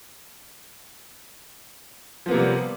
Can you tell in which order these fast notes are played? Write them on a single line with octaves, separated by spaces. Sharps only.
F3 B3 A#3 C3 G3